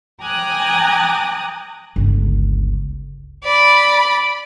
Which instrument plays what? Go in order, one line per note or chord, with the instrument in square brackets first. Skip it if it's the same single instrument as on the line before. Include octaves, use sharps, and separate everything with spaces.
[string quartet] G5 G#5 A#5 D6 D#6 F#6
[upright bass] G1 C#2
[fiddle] D5 B5